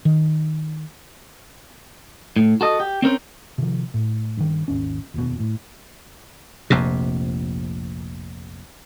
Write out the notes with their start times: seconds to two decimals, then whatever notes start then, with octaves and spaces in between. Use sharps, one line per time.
0.05 D#3
2.36 A2
2.61 F#4 A4 D#5
2.80 G4
3.02 C4 C#4 A#4 C5
3.58 C3 D#3 F3
3.94 A2
4.37 G2 D#3
4.68 G#1 D#2 C#4
5.14 F1 D#2 G#2 B2
5.40 A2
6.70 F1 A#1 F2 C3